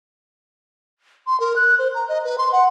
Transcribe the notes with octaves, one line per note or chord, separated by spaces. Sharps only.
C6
A#4
F#6
C5
A#5
D#5
B4
C6
F#5